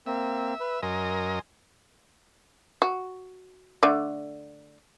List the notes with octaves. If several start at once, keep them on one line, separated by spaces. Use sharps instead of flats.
A#3 C4 E5
B4
F#2 A#4 D#5 G#5 C6
F#4
D3 A3 D5